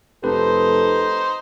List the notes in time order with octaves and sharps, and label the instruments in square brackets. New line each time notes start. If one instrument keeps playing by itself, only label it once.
[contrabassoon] F1 [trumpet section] D#4 C5 [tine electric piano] G4 B4 [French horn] A4